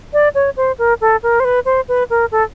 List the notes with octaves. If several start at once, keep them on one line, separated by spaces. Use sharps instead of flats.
D5
C#5
C5
A#4
A4
A#4
C5
B4
C5
B4
A#4
A4